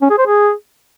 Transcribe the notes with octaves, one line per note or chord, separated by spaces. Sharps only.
C#4
G#4
C5
G#4